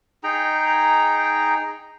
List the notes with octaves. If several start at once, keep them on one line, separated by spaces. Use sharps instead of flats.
D#4 G#4 G5 A#5